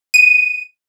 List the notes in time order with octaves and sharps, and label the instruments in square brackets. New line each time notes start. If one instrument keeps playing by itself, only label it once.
[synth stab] D#7